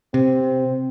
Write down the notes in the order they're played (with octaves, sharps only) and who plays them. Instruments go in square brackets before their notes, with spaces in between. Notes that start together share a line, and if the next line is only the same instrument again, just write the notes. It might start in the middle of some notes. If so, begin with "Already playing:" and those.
[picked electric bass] C3 [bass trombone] C4